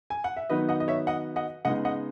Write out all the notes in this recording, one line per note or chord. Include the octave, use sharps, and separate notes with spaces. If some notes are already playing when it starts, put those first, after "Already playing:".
G#5
F#5
E5
D#3 F#3 B3 D#4 B4 D#5
D#5 F#5
D#5
C#5 E5
D#5 F#5
D#5 F#5
C#3 G#3 B3 D#4 D#5 F#5
D#5 F#5